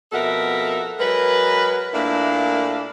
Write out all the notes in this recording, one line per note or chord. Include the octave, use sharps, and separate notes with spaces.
F2 B2 A4 A#4 E5 F#5
F#3 G#3 A#4 B4
A#2 A3 A#3 D4 E4 F5